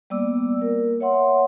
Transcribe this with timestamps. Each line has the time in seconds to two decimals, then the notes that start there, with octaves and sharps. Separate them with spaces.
0.10 G3 A#3 B3 D5 D6 E6
0.59 A#3 A#4
1.00 C#5 E5 F#5 C6